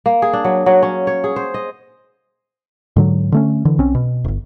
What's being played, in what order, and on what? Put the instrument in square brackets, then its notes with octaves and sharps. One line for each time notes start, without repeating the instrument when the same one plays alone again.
[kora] A#3
G#4
D4
F#3
F#3
C#4
C#5
G#4
C5
D#5
[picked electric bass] G#2 D3 F#3
D3 A3 C#4
D3 E3
B1 C4 C#4
B2
D1 G1